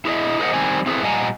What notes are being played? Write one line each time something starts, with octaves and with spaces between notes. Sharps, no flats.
E4 G#4 A#4 C#5 D#5 E5
G#4 A#4 C5 D#5 F#5
D#3 G3 C4 G#5
C4 E4 G#4 A4 B4
A#2 G3 D#5 F#5 G#5 A#5